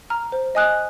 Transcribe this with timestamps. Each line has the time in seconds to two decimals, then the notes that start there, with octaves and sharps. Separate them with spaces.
0.10 A#5 F6
0.32 C5
0.55 D#5 G#5 D#6 F#6